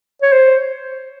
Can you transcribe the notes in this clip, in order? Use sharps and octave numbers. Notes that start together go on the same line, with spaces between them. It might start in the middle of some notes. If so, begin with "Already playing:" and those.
C#5
C5